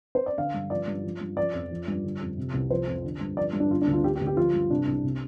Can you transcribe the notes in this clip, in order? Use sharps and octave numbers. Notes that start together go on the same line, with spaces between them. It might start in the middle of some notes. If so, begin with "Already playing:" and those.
C5
D5
D3 F5
G2
F3 D5
G2
F3
G2
F3 D5
F2
F3
G2
D3
F2
C3
C2
F3 C5
F2
D3
G2
F3 D5
G2
D4
D3 F4
D4
D2
F4
D3 G4
G4
D2
G4
F3 F4
G2
C3 D4
C2
C3